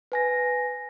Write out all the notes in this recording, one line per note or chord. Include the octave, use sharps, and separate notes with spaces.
B4 G#5 A#6